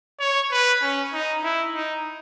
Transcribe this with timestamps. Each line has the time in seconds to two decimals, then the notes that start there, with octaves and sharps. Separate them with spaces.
0.20 C#5
0.51 B4
0.82 C#4
1.13 D#4
1.44 E4
1.75 D#4